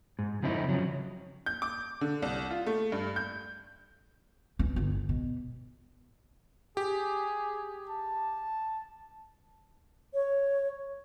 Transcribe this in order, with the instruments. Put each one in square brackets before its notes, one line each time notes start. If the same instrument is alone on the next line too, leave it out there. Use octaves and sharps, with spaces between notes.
[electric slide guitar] G#2
F2 C#3 C4 D#4 E4
C#3 F3 F#3
[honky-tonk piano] G6
D6
D3
C2
F4
A3
G2
G6
[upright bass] E3 C#4
G1
B2
[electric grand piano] G4 [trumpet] G#4
[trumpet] A5
[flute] C#5